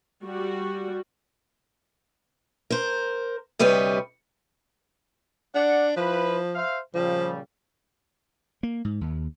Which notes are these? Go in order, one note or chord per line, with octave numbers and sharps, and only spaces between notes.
G3 F#4
A#4 C5
D2 C3 G3 B4 C#5 D#5
D4 D5 F#5
F3 E4 F4 B4
C5 E5 F5
A#2 C#3 F3 G3
A#3
G#2
D#2